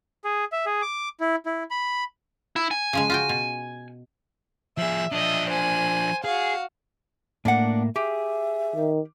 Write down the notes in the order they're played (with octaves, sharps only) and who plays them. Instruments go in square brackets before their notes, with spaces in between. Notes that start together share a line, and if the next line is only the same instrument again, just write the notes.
[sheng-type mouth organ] G#4
E5
G#4
D6
E4
E4
B5
[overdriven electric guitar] E4
G#5
[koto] C#3 F3 G#3
F4 F#4 G5
B2
[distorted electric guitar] F3 G#4 [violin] E5
[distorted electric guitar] F3 D4 [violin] D#5 E5
[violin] C5 G#5
[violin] F#4 F5 [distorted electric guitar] G#4
[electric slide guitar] A2 A#3 [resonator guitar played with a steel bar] D4 F#5
[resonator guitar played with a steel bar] G4 [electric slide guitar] G#4 [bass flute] E5
[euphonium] D#3